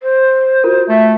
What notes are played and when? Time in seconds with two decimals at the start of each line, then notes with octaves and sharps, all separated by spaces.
0.03 C5
0.64 F4 F#4 A#4
0.89 A3 E5